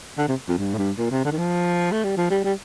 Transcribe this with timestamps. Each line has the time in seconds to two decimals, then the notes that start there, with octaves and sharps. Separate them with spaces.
0.18 D3
0.28 C3
0.49 F2
0.58 G2
0.74 A2
0.78 G2
0.98 A#2
1.11 C3
1.25 D3
1.32 D#3
1.38 F3
1.92 A3
2.04 G3
2.17 F3
2.30 G3
2.44 G3